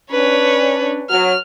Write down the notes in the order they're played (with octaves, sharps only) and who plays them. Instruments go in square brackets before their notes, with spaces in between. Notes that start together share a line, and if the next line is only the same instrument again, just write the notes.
[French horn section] C#4 D4 [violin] B4 C#5
[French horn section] F#3 [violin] F6